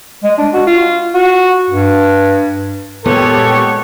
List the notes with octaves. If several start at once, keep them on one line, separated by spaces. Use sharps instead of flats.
G#3
D4
F#4
F4
F#4
G2
A#2 G#3 B3 G4 A4 C#5